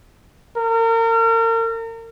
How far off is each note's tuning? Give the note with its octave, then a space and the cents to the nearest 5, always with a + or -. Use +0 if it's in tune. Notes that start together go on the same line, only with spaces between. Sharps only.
A#4 -35